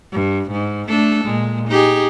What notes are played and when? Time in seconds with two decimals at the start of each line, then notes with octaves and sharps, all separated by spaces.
0.12 G2
0.51 G#2
0.89 A3 D4 A4
1.25 A#2 G#3
1.68 D#4 G4 G#4